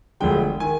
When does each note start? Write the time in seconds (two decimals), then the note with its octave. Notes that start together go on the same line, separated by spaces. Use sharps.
0.20 E1 D2 D3 F3 G#3 G5
0.60 D#3 G#5